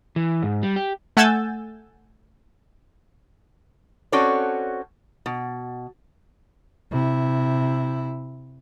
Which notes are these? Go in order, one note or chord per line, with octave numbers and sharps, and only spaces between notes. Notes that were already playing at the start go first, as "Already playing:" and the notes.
E3
G#2
G3
G4
A3 F#5 G#5 E6 G6 A6
C4 C#4 F#4 A4 C#5 D5
B2
C3 E4